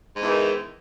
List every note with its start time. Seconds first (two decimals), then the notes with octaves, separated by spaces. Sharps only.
0.15 G#2
0.20 E2
0.25 E3
0.29 D#3